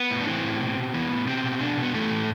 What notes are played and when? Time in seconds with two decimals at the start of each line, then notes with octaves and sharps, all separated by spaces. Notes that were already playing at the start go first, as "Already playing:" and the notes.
Already playing: B3
0.10 A2
0.21 D4
0.27 E3 C4
0.44 A2
0.61 B2
0.77 B2
0.94 E3 B3
1.10 A2
1.28 B2 C4
1.44 B2
1.61 B2 D4
1.77 B2
1.82 B3
1.94 E3 A3
2.11 A2